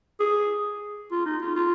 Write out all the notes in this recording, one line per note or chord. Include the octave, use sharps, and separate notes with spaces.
G#4
F4
D#4
F4
F4